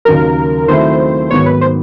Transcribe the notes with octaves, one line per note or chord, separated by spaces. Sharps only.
D#2 C#3 F#3 A#4
D#3 F#3 A3 C4 E4 C5
G#2 D#3 F#3 B3 C#5
B4
C5